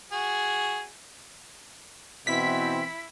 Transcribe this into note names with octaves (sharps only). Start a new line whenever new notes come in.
F#4 G#4
B2 E3 C4 E4 B6